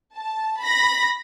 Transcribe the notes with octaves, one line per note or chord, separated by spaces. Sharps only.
A5
B5 A#6